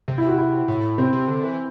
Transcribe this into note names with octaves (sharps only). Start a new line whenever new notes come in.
C3
E4
F#4
E4
A2
C3 C4
C3
D3
E3